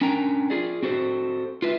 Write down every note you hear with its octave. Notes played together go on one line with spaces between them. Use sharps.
C#4 D4 A#4 G5 A#5
F4 G#4 D5
C4 F#4 A4 C5
F4 B4 E5